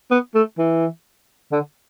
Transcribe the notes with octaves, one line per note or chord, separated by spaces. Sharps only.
B3
A3
E3
D3